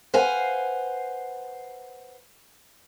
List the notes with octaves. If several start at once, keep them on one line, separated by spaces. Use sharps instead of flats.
B4 C5 F5 F#5 G#5